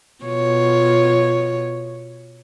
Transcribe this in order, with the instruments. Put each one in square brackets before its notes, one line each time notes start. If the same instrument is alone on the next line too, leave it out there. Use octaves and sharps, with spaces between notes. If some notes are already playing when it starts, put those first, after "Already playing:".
[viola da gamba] B2 F4 C#5